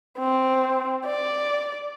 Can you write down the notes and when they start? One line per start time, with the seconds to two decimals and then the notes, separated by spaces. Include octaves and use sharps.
0.19 C4
1.06 D5